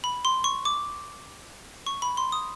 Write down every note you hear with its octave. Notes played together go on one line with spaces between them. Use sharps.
B5
C6
C#6
D6
C#6
B5
C6
D#6